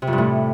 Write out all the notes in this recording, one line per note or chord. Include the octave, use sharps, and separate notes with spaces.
C3
F2
G2
A2